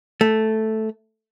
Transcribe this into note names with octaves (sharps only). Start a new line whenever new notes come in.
A3